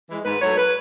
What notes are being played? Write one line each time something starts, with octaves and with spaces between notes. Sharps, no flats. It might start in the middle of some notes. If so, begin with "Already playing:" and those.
E3 G#3
G#2 B4
F#3 A3 C#5
B4